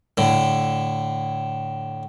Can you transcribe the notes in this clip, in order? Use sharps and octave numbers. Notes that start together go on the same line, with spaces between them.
A2 D3